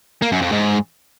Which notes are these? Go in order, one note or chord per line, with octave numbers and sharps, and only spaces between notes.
A#3
F#2
F2
G#2